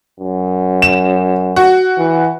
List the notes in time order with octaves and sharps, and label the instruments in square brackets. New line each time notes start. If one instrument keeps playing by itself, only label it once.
[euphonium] F#2
[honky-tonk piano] E7
F#4
[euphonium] E3